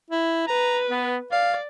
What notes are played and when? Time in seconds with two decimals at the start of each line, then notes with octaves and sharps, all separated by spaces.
0.11 E4
0.47 B4 A#5
0.90 B3
1.32 D5 F5